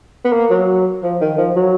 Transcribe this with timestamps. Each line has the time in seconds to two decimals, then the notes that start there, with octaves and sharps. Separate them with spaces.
0.25 B3
0.33 A#3
0.50 F#3
1.03 F3
1.21 D#3
1.38 F3
1.56 F#3